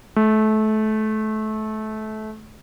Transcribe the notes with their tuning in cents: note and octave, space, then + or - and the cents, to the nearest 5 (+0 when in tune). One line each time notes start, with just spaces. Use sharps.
A3 -25